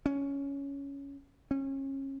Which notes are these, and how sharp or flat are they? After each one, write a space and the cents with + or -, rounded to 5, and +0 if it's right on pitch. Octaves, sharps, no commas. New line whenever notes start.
C#4 +10
C#4 -30